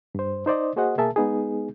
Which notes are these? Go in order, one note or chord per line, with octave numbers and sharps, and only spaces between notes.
G2 C5
D#4 C5 D5 D#5
A#3 F#4 G#4 C5 D#5 F#5
B2 A#3 G#4 A#4 E5 A5
G#3 B3 D#4 G#4